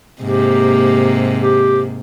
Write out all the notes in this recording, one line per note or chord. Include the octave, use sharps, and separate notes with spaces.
G#2 C3 A#3 G4
G4